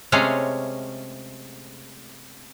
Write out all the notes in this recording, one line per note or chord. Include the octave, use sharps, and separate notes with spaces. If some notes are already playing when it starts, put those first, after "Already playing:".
C3 G#3 A3 C#4 G#4 F5